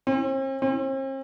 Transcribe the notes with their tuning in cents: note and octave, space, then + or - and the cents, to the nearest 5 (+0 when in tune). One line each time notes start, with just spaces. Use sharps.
C4 +45
C4 +45